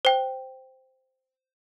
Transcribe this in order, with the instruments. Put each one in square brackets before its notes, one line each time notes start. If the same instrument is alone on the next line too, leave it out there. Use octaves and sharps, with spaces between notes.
[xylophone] C5 G5